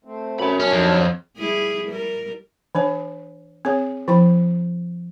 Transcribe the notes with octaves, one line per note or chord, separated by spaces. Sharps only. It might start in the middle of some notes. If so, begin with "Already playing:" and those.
A3 C4
F#2 C#4 B5
D#2 F#3 C#4 D4 C#5
F2
G3 E4 G#4
G3 A#4
E3 D4 C#5
C4 G#4 C#5
F3 E4 G5 B5